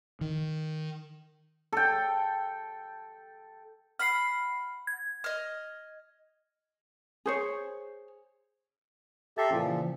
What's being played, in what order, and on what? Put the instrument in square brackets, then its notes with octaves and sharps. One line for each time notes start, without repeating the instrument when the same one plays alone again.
[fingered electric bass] D#3
[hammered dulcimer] A4 G5
[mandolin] F#5 B5 [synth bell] F6 C7
[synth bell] G#6
[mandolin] D#5 F6
[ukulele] G#4 C5 C#5
[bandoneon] G4 A4 E5 [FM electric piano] A5 A#5 C6
[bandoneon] A#2 F3 [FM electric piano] C#3 E3